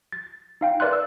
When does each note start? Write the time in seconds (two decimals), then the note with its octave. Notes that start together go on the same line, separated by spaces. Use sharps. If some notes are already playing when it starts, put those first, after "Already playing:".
0.12 A6
0.61 D#4 F5 G5
0.80 A#4 B4 D5 E5 C6 F#6
0.93 E6